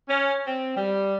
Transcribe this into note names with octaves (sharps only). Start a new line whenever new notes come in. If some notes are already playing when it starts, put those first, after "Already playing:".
C#4
C4
G3